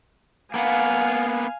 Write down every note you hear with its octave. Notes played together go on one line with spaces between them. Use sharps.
A#3 B3 F5 G#5